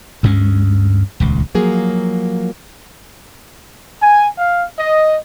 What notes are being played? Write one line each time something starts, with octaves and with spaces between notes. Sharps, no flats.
D2 G2 G#3 C#4
D#1 C#2
F3 F#3 A#3 G#4
G#5
F5
D#5